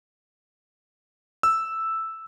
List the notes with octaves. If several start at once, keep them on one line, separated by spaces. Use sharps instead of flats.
E6